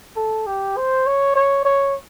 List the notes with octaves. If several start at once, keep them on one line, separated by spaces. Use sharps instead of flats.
A4
G4
C5
C#5
C#5
C#5